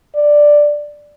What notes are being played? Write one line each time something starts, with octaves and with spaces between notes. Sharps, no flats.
D5